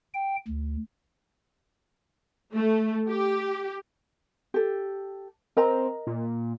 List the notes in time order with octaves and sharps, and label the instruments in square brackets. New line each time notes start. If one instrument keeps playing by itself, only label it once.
[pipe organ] G5
D2
[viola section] A3
G4
[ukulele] G4 A4
[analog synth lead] C4 [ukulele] A#4 D#5 A#5
[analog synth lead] A#2